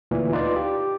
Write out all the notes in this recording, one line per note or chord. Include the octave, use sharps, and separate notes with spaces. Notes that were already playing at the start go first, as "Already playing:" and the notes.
D2 A#2 E3
D#4 F4 B4 D5
G4